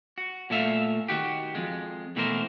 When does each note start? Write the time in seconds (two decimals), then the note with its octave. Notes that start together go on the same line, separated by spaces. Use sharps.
0.18 F#4
0.50 A#2 A3 E5 F5
1.08 D#3 F#4 G4
1.55 F2 G#3
2.16 B2 E3 A3 A#3 A#4 C5